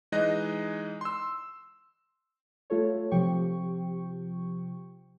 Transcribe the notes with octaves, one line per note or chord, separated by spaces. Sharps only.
E3 G#3 D#4 D#5 F#6 A#6
C6 E6
A3 F4 A4 C#5
C3 F3 G4 G5 C#6